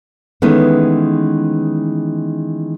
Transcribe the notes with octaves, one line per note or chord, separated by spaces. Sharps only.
D#3 E3 G#3 A3 B3 C#4